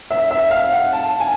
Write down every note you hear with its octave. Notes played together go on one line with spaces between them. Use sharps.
E5
E5
F5
F#5
A5
G#5